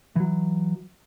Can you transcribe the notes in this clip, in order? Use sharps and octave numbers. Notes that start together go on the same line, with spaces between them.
E3 F#3